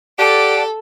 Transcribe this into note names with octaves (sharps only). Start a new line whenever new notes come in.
G4 A4 D5 F#5 A5 D7